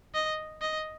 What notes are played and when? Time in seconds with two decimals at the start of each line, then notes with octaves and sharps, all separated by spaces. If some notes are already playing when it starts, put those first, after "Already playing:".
0.14 D#5
0.62 D#5